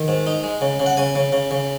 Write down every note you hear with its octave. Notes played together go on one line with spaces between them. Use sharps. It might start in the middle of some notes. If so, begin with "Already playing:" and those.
Already playing: D#3
G#2
D#4
G#3
C#3
C#3
F#5
C#3 G#5
C#3
C#3
C#3